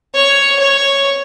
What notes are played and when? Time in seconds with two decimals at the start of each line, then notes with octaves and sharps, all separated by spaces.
0.15 C#5
0.59 C#5